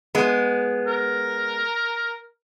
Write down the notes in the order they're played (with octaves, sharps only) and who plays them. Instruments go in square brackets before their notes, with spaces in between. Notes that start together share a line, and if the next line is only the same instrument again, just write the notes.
[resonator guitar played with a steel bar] G#3 B3
[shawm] A#4